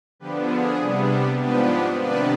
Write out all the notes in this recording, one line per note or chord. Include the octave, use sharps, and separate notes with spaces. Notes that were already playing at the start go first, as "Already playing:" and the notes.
D3 F3 B3 D4 G4 B4
G#4
C3 G3 B3 D4
G#2 F3 B3 D4 G4 B4
C3 D#3 B3 D4 B4 D5